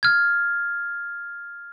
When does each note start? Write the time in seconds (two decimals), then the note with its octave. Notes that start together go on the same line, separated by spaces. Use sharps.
0.03 F6 G#6